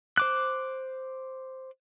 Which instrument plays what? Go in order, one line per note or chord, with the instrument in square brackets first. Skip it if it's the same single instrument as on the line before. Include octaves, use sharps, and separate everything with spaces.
[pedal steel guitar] C5 D6 F#6